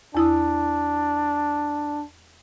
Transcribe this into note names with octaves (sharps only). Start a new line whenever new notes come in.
E2 D4 E4 D#6